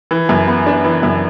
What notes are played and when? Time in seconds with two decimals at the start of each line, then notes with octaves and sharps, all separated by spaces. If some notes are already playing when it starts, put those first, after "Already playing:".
0.11 E3
0.29 F#2
0.48 B3
0.67 D4
0.84 E3
1.03 F#2